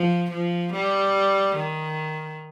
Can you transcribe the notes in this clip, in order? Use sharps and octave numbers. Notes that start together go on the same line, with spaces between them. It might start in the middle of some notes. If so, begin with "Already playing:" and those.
Already playing: F3
F3
G3
D#3